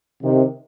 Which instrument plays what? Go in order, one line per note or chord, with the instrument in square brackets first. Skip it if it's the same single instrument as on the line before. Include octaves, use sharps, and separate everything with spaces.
[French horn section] C3 D#3